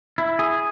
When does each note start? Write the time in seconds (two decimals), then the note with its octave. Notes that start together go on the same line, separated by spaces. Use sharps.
0.18 E4
0.39 G#4